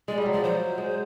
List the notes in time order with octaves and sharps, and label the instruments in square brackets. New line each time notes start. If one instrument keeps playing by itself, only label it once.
[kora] G#3 [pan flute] D5
[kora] G3 [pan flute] D#5
[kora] F#3
[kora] F3 [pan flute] D5
[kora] F#3 [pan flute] C5
[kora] G#3